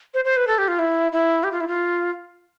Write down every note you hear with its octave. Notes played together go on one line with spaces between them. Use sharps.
C5
C5
B4
A4
G4
F4
E4
E4
G4
F4
E4
F4